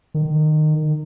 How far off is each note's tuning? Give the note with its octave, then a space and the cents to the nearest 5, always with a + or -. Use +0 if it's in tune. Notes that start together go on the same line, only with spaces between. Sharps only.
D#3 -20